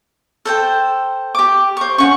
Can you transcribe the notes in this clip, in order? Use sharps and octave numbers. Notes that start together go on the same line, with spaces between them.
A4 C5 G5
G4 D6
C5 C#6
C#4 F#5 C#6